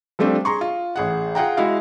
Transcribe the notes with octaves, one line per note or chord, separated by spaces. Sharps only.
F3 G3 A3 C4 D4
G#4 A#5 C6 C#6
F4
A1 G#4 F#5
F4 G#4 F#5 G5 A#5
G#3 E4 F#4 F5